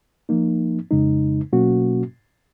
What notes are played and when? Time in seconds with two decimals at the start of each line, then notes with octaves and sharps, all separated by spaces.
0.29 F3 A#3 D#4
0.91 F2 C#3 G#3 D#4
1.52 B2 F#3 A#3 C#4 F#4